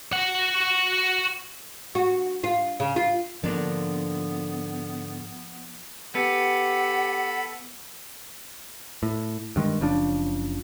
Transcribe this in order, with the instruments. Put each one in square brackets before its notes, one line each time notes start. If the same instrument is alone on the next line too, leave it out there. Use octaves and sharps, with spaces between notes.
[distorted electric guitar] F#4 F#5
[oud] F#4
F4
C#3
F4
[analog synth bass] G#2 [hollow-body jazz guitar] D3 A#3 D4 [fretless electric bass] F3 [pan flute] B3
[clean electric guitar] B3 [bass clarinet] G4 [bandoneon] A4 B5 [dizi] F#5
[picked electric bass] A2
G2 D#3 G#3
F#1 C#3 F3 D4